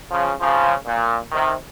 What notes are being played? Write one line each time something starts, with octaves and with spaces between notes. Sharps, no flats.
C#3 F3
C#3 F3
A#2
C3 D#3